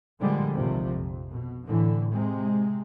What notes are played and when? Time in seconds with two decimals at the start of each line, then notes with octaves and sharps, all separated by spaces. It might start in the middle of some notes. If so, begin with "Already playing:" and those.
0.20 A#2 D3 F3 G3 G#3
0.55 A#1 D#2 C3 F3
0.91 F2
1.32 B2
1.67 A2 D3 E3
2.13 C3 G#3